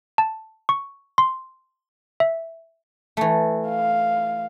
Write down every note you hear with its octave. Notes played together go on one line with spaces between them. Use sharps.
A5
C#6
C6
E5
E3 A3
F5